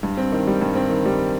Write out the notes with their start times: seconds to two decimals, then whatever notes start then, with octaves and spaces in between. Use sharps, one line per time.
0.03 G2
0.17 C4
0.32 D#3
0.47 G3
0.61 G2
0.75 C4
0.90 D#3
1.05 G3